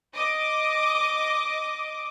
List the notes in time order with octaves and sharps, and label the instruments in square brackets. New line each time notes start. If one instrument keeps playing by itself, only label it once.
[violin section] D#5 D6